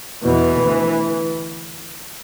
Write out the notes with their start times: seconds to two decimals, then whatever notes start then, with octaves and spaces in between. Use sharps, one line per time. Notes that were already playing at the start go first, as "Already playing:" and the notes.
0.23 E2 B2 E3
0.58 D2